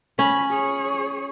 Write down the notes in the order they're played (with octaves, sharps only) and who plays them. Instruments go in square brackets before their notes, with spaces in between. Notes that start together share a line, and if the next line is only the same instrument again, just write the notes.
[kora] C#4 [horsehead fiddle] B5
[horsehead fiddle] G#4 C#5